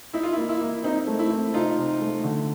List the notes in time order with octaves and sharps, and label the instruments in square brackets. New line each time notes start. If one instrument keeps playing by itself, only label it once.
[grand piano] D#4 [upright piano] E4
[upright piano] F4
E4
[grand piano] A#3
[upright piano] E4
[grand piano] A#3
[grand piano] C4 [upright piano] D#4
[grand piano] A3
[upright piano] E4
[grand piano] C4
[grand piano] C3 [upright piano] D#4 F4
[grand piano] C3
A3
D3